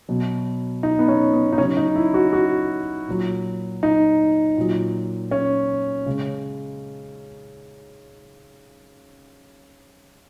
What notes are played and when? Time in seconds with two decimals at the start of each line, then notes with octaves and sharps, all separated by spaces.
0.09 B2 F#3
0.83 D#4
0.99 B3
1.08 C#4
1.33 B3
1.53 D#4
1.58 C#3 F#3 C#4
1.77 D#4
1.96 E4
2.14 F#4
2.33 F#4
3.07 A#2 F#3
3.83 D#4
4.57 A#2 F#3
5.31 C#4
6.06 C#3 G#3